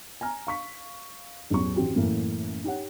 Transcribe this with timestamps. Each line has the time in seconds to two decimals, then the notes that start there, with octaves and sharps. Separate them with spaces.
0.21 G#5 A#5 F6
0.47 F5 C#6 B6
1.50 A1 E2 F#3 C#6
1.75 A1 C4 F#4 G4
1.96 F#2 A2 E3 A#3 C#4
2.64 D#4 G4 C#5 F#5